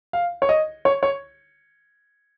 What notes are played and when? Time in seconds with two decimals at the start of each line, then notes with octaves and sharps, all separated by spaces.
0.13 F5
0.42 C#5
0.49 D#5
0.85 C#5
1.03 C#5